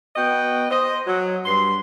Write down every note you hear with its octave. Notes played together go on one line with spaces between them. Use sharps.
B3 F#4 D#5 G5
C5 D#5
F#3
G2 C6